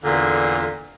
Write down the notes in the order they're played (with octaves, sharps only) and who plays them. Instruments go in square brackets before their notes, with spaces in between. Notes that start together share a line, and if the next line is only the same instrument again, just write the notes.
[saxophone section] E2 A#2 D3